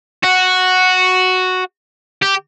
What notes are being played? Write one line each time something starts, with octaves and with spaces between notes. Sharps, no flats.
F#4
G4